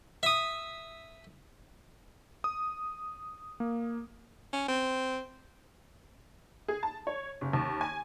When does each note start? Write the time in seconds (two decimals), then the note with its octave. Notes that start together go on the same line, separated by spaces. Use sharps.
0.23 E5 D#6
2.44 D#6
3.60 A#3
4.53 C#4
4.68 C4
6.68 G#4
6.83 A5
7.07 C#5
7.41 F#1
7.53 D#2
7.81 G#5